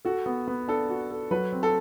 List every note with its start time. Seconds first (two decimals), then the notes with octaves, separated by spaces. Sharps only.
0.05 F#4 A4
0.26 B3
0.48 B3
0.68 D4 A4
0.90 F#4
1.11 A4
1.31 F#3 B4
1.53 C4
1.63 A4